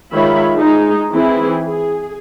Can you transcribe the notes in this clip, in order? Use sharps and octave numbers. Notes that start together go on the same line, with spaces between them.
D#3 G#3 F4 C#5 E5 B5
G#3 D#4
E3 C4 E4 G#4
G#4